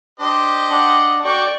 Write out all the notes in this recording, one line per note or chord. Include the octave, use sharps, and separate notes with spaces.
D4 G4 C5 D#5
D4 F#5
D4 F#4 D5 G5 C#6 D6